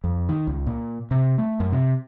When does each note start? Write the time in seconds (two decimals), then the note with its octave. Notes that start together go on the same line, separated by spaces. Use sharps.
0.04 F2
0.29 D#3
0.47 C#2
0.67 A#2
1.11 C3
1.38 A3
1.60 F#2
1.72 C3